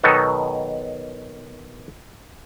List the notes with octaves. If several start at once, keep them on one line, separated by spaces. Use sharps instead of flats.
B2 D#3 F#3 B3 D#4 A4